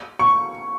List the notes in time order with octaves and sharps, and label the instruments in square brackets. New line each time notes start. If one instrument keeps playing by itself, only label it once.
[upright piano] C#6